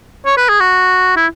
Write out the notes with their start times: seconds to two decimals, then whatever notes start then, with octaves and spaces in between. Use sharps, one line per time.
0.26 C#5
0.37 B4
0.49 G#4
0.60 F#4
1.16 E4